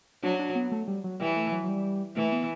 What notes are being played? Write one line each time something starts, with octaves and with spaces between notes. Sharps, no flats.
F#3 D4
D4
B3
A3
G3
F#3
E3 G3
A3
F#3
F#3
G3
E3 A3
B3